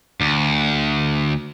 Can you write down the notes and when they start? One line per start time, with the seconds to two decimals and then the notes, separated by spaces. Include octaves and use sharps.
0.21 D2